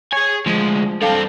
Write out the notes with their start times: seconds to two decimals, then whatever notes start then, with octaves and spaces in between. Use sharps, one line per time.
0.13 G#4 C#5 G#5
0.46 D2 F3 G#3
1.02 G2 C4 A4 F5 A5